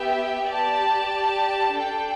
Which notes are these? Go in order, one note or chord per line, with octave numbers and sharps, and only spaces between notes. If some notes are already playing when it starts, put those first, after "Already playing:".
Already playing: B3 G4 E5 G5
G4 D5 A5
D4 A4 G5